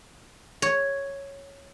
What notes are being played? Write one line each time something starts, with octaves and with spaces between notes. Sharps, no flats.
C#5